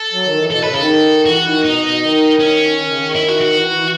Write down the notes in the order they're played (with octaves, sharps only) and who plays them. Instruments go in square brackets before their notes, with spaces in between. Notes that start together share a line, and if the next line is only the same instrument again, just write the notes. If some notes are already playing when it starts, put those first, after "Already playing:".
Already playing: [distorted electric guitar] A4
[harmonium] F#3
D#3
E3
[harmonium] B2 [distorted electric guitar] A4
[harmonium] A2 [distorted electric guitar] B4
[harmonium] C#3
[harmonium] D#3 [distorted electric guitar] A4
[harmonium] E3 [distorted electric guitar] F#4
[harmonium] D#3
[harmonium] B2 [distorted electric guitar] D#4
[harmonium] B2
D#3
[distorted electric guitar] C#4
[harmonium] D#3
C#3
D#3
[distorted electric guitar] E4
F#4
F#4
[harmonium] E3
E3